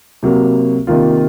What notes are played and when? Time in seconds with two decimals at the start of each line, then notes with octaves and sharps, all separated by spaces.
0.23 C3 F#3 A#3
0.87 C3 D#3 A#3 F4